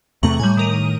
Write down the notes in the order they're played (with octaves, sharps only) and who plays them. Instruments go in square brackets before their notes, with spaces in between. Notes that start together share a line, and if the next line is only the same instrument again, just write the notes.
[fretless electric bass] E2 C3 A3 [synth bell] A#5 C#6 F#7
[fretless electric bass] A2 [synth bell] G3 G#5
[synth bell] D#3 A#4 D#7